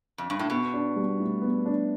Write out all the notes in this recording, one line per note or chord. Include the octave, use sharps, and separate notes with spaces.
F2
G2
A2
B2 B3
D4
G3
A2
B3
D4